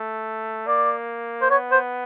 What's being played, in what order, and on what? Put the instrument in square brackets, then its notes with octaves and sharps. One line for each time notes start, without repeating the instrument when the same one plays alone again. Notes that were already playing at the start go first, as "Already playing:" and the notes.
Already playing: [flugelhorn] A3
[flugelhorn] A#3 [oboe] D5
[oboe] C5
[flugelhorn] B3 [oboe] C#5
[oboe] C5